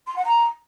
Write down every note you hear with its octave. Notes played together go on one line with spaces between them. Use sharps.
C6
F#5
A#5